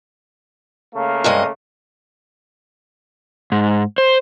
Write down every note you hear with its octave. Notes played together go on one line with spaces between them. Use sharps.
C#3 A3 A#3
G2 G#3 D#5
G#2
C5